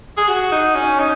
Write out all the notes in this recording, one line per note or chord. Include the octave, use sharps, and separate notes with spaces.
G#4
F#4
D#4
C#4
D#4